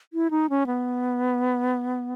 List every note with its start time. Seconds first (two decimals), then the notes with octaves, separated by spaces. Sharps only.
0.13 E4
0.31 D#4
0.50 C#4
0.67 B3